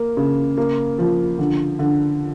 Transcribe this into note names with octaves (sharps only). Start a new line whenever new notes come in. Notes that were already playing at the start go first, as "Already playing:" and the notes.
Already playing: A#3
C#3
A#3
F3
D3
D3